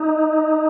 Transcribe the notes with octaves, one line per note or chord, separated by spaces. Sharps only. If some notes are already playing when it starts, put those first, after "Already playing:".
Already playing: D#4